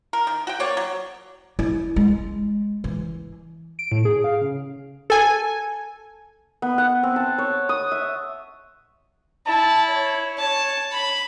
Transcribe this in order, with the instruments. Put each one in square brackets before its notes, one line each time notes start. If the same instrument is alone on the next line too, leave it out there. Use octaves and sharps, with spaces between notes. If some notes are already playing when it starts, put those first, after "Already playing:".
[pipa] A#4
D#3
F#4 G5
A#3 C#5 D5
F#3
[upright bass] E4
G#3
E3
[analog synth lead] D7
A2
G#4
F5
C#3
[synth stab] A4 G#5
[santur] B3
F#5
C4
A5
C#5
D#6
E5
[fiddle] E4 [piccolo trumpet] A5
[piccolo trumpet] C#5
[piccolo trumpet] C#5 [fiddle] A5
[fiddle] B5